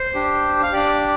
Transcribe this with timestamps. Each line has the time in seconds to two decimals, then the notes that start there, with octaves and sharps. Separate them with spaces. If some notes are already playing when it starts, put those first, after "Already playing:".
Already playing: C5
0.14 D4 G4
0.63 F5
0.72 D4 G4 D5